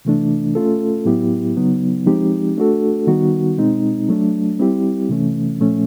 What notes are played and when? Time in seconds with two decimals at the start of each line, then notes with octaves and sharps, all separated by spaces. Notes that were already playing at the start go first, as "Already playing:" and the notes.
0.05 C3 E3 A3 D4
0.55 A3 C#4 F4 A4
1.05 A2 F#3 B3 E4 G4
1.57 C#3 F#3 B3 D#4
2.06 F3 G#3 C4 D#4 G4
2.57 A3 D4 F#4 A4
3.07 D#3 G3 B3 D#4 F#4
3.58 B2 G#3 C4 D#4
4.09 F#3 A3 D4
4.59 G3 C4 E4 G4
5.09 C3 E3 A3 C#4
5.60 A#2 F3 A3 C#4